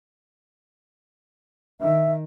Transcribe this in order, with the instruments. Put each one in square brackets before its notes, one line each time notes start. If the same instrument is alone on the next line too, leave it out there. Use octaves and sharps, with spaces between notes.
[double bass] D#3 [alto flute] E5